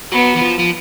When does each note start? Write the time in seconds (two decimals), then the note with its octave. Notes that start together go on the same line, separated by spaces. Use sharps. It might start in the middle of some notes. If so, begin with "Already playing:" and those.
0.12 F#3 B3
0.36 E3
0.42 F3
0.59 F3